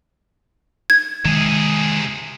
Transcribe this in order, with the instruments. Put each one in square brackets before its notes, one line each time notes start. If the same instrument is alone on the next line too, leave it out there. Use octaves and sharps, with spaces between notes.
[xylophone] G#6
[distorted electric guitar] C3 G#4 [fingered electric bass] D#3 G#3